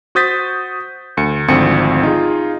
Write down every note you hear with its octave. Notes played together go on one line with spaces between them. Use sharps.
F#4 C5 D#6 G6 A6 B6
D2 C#7
G#1 D2 F3 C4 C#7
D#4 F4 G#4